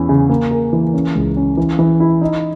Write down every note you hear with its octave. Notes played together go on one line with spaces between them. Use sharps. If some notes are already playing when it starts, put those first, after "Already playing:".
Already playing: E2 C#4 E4
C#3
A#3
A#4
E3
C#4
C#2
C#4
E3
E3
E4
D#4